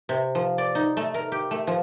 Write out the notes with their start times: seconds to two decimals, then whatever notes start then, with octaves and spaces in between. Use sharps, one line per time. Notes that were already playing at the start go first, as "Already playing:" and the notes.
0.09 C3
0.35 F3
0.58 D5
0.75 D#4
0.97 A3
1.14 A#4
1.32 G4
1.51 A3
1.67 F3